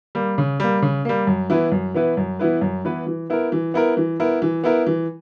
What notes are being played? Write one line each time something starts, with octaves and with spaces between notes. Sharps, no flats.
G3 A#3
C#3
G3 A#3
C#3
G3 A#3
F#2
E3 B3 E4 B4
F#2
E3 B3 E4 B4
F#2
E3 B3 E4 B4
F#2
E3 B3 E4 B4
E3
B3 E4 A#4
E3
B3 E4 A#4
E3
B3 E4 A#4
E3
B3 E4 A#4
E3